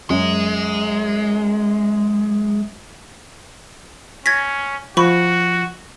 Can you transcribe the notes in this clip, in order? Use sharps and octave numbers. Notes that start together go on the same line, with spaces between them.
F#2 G#3
C#4 G#6 A#6 B6
F3 F#4 B5 C#6